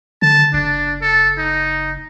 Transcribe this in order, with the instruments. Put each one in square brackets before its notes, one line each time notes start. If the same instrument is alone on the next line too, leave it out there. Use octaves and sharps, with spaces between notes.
[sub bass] D3 [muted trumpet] A5
[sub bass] F#1 [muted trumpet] D4
[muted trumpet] A4
D#4